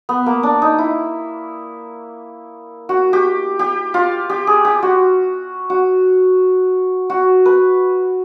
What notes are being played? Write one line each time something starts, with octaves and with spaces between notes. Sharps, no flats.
B3
A#3
D4
D#4
E4
F#4
G4
G4
F4
G4
G#4
G4
F#4
F#4
F#4
B4